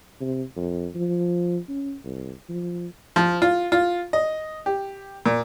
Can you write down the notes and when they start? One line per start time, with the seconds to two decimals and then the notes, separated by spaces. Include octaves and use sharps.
0.21 C3
0.56 F2
0.95 F3
1.68 C#4
2.04 C2
2.49 F3
3.16 F3
3.42 F4
3.72 F4
4.13 D#5
4.66 G4
5.26 A#2